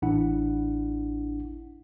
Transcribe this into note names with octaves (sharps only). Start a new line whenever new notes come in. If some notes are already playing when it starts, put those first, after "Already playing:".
A1 D4 E4 F#5